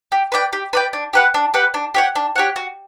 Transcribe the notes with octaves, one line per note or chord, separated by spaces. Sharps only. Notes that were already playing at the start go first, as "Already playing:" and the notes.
G4
B4 D5 G5
G4
B4 D5 G5
D4
G4 B4 F#5
D4
G4 B4 F#5
D4
G4 C#5 F#5
D4
G4 C#5 F#5
F#4